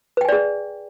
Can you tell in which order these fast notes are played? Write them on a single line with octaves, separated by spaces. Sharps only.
B4 G5 G#5 D5 G#4